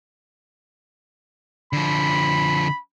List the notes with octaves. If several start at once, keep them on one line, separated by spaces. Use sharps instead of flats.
D3 F3 B5